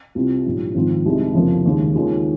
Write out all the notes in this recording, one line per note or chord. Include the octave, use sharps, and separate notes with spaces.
C2 C3 G3 C4 F4
A#1 G#2 G3 C#4 F4
G#1 G#2 F3 C4 F4
C2 C3 D#3 G#3 D#4
F1 F2 C#3 F3 A#3
D#2 C#3 G#3
D#2 D#3 G#3 C#4 F4